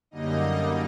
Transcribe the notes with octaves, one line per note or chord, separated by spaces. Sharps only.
F#2 D3 G3 A#3 D#4 D#5